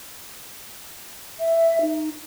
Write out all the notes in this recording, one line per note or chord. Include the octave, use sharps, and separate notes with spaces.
E5
D#4